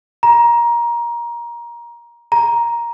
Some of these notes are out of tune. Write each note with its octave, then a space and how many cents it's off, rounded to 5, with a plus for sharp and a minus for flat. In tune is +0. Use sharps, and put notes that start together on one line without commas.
A#5 +20
A#5 +10